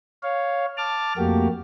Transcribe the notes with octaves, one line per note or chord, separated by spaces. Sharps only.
C#5 F5
A5 D6 F6
F2 A3 A#3 F#4 G4